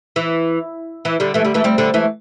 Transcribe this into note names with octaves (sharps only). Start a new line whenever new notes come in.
E3
E3
D3 G3
E3 A3
D3 G3
E3 A3
G3 C4
D3 G3
E3 A3